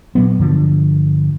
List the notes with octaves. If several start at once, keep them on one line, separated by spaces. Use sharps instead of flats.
A#2 F#3 B3
G2 D3 F3